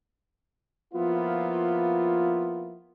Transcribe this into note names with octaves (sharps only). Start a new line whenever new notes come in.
F3 A#3 B3 E4 F4